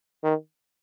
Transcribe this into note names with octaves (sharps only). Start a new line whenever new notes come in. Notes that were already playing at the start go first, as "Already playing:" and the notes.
D#3